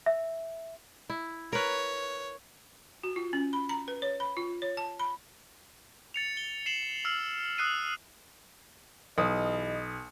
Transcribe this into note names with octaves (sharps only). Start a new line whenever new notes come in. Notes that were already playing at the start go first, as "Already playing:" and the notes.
E5
E4
A#4 B4 C#5
F#4
F4
C#4
B5
A#5
B4
C#5
B5
F4
C#5
A5
B5
A6 C#7 F7
G7
C7 E7 F#7 G7
E6 F6 C7
D#6 E6 F#6 C7 D#7
B1 E3 G4 D#5 D#6